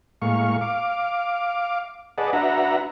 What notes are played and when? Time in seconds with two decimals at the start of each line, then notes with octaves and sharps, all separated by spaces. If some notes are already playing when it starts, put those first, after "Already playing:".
0.22 A2 G#3 A#3 F5 C#6
0.61 F5 D6
2.18 G#4 B4 D5 D#5 F#5 A5
2.33 D4 F#4 B4 E5 F#5 A#5